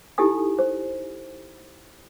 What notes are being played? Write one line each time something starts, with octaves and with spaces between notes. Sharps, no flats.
D#4 E4 G4 A4 G#5 D#6
C5